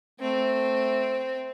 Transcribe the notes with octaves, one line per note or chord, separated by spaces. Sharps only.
A3 C4